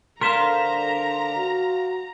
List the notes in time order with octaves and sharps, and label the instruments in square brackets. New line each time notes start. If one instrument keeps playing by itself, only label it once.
[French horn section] D3 [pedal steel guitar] A#4 C5 F5 [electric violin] A#5 [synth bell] C6 B6 E7
[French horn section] F#4